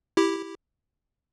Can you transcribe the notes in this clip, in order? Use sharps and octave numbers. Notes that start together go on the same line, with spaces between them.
E4 G4